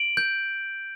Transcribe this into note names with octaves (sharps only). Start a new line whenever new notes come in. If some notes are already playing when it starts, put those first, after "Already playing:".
Already playing: D7 F#7
G6